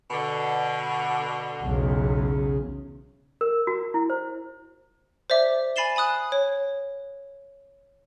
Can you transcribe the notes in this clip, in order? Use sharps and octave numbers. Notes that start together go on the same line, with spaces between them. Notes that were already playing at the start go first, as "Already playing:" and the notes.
B2 D3
B1 E2 C#3
A#4
F#4
E4
C5
C5 D5 E5 D6
G#5 B5 A6 C7 E7 G7
G#5 B5 D#6 F#6
C#5